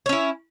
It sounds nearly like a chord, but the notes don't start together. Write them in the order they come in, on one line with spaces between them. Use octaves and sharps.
C#5 C#4 E4